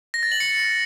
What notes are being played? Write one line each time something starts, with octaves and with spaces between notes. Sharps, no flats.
A#6
A6
F#7
C#7